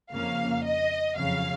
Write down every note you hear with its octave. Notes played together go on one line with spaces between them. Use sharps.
F2 C#3 F3 A#3 F5
D#5
F2 C#3 F#3 F5